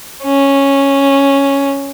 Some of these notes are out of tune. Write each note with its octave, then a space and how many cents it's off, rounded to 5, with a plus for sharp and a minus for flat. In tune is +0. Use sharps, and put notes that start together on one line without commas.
C#4 -5